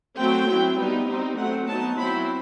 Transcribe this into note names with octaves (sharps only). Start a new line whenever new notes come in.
F#3 A3 C4 G5
F#3 C4 E4
G3 B3 D#4
G3 C4 D#4
F#3 A3 C4 F#5
F#3 B3 D#4 A5
F#3 C4 E4 B5